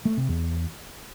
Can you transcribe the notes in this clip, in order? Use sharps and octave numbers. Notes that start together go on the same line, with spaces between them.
A3
C3
E2